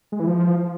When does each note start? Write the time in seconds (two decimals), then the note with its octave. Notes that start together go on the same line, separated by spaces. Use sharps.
0.12 G#3
0.20 E3
0.27 F3